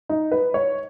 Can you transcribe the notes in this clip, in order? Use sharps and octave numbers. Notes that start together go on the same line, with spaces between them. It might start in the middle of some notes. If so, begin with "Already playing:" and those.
D#4
B4
C#5